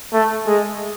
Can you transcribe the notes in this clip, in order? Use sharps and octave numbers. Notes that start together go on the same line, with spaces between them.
A3
G#3